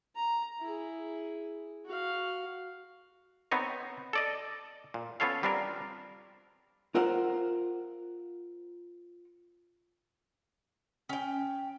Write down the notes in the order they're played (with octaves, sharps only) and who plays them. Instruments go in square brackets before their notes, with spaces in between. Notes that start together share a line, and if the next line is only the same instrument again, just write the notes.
[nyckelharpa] A#5
E4 G#4
F#4 F5
[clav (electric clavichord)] B3 C4 D#4 C#5 D#5
A4 D5 D#5
A#2
B3 C#4 F4 A4 C#5 F5
G3 C4 D4 F4 A#4
[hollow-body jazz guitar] F4 A#4 C5 F#5
[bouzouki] C#4 G5